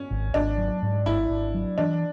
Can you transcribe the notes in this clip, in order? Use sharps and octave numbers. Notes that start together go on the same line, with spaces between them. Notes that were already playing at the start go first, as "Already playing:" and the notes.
Already playing: C#4
G#1
G#1 D4
F#3
G#2
G#1 E4
G#1
F#3
E3 D4